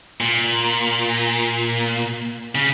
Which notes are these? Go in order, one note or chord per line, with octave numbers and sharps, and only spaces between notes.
A#2
C#3